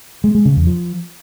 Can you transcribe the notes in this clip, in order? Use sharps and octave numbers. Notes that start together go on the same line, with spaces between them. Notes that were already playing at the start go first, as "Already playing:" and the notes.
G#3
G#3
C#3
E2
F3